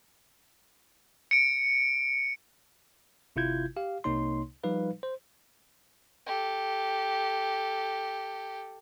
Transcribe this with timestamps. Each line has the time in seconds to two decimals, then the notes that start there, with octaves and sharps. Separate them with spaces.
1.31 C#7 D7
3.36 G#1 C3 E4 F4 G6 G#6
3.77 G4 F5
4.04 C2 C3 A#3 D#4 C#5 C6
4.63 F3 G3 D#4 B4 F5
5.03 C5
6.27 G4 A4